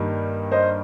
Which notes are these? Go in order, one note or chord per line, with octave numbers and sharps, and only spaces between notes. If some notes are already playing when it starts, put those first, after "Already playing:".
Already playing: G2 D#3 G3 A#3
C5 D#5